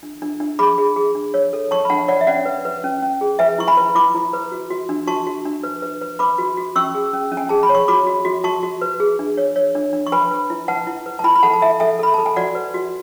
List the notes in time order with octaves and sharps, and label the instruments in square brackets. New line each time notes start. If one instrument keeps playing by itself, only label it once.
[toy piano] D4
D4
D4
G#4 B5 D6
G#4
G#4
D4
C#5
A4
C#5 A5 C#6
B5
D4 F#5 A5
C#5 D5 F#5
E5
C#4 D5 F#5
B4
B4
C#4
C#4
G#4
B4 E5 G#5
E4 C#6
G#5 B5
B4
E4 B5 D6
E4
B4
F#4
F#4
D4
F#4 A5 C#6
F#4
D4
B4
B4
B4
B4 B5 D6
F#4
F#4
C#4 C#6 E6
G#4
C#4
C#4
G#5
G#4 A5
B5
C#5
C#6
F#4 B5 D6
F#4
F#4
F#4 A5 C#6
F#4
B4
G#4
D4
C#5
C#5
D4
D4
C#6
B4 G#5 B5
B4
E4
B4 F#5 A5
E4
B4
A5
E4 G#5 B5
B5
A4 F#5 A5
A5
A4 E5 G#5
A4 E5 G#5
A4 B5
A4 A5
G#5
F#4 D5 F#5
B4
F#4